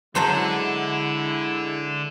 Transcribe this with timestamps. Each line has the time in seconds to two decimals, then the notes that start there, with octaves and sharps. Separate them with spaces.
0.15 D3 F#3 G#3 E4 C5 A5